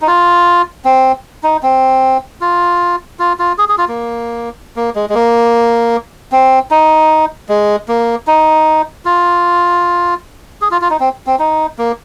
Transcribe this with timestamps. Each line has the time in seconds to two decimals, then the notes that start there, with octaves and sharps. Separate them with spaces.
0.02 D#4
0.07 F4
0.85 C4
1.43 D#4
1.63 C4
2.41 F4
3.19 F4
3.39 F4
3.58 G#4
3.69 G#4
3.78 F4
3.88 A#3
4.76 A#3
4.95 G#3
5.09 G#3
5.15 A#3
6.32 C4
6.71 D#4
7.49 G#3
7.88 A#3
8.27 D#4
9.05 F4
10.62 G#4
10.71 F4
10.81 F4
10.90 D#4
11.00 C4
11.27 C4
11.39 D#4
11.78 A#3